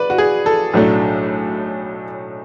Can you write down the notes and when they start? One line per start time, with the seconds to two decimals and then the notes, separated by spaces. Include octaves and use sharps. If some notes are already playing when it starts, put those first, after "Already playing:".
Already playing: B4 D5
0.10 F#4
0.18 G#4
0.46 A4
0.73 B1 A2 F#3 A3 D4